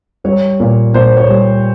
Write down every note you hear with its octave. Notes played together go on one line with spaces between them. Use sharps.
G3 C#5
A#2
A#2 C5
C#5
G3